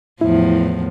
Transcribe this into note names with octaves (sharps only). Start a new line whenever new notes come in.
E2 A2 F3 E4